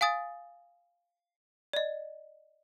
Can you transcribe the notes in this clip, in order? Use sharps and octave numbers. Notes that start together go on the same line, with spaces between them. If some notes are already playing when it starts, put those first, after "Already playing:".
F5 G#5 D#6 A6
D5 D#5